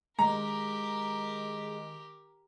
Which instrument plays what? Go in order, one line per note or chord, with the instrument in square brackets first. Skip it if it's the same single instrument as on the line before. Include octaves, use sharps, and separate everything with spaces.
[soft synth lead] D#3 [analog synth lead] G#3 [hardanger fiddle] G4 A#4 [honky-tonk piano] A#5